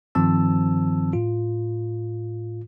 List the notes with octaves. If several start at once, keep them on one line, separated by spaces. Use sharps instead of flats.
G2 D#3 F3 C4 A5 E6
A2 F4